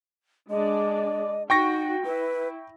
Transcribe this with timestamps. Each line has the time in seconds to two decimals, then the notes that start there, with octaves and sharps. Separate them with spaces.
0.50 G#3 D4 D5 D#5
1.50 D#4 F#4 G5 C#6 A#6
2.05 E4 B4